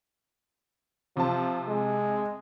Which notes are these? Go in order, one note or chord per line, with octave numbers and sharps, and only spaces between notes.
C3 F3 A5
G#3